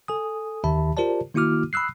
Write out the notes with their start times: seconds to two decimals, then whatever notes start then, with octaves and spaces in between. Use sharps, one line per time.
0.08 A4 G#5 D#6
0.64 D#2 D#3 G4 E5 A5 B5
0.97 F4 G4 A#4 C5 D5 A5
1.34 D#3 A#3 E4 F#4 D6 F6
1.73 B5 D#6 E6 F#6 C7